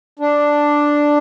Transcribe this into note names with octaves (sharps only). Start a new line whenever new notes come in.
D4